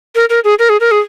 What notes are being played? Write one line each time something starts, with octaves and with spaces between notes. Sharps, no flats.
A#4
A#4
G#4
A#4
G#4
A#4
G#4